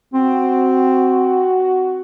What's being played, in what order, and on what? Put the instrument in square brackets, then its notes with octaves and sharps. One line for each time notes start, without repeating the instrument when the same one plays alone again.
[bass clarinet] C4 [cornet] F#4